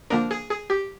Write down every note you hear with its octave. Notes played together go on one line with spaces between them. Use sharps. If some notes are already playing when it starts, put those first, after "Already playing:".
D3 F3 A#3 D4 A#4
G#4
G#4
G4